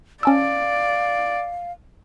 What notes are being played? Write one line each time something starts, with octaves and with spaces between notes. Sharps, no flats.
C#4 D5 F5 A5 E6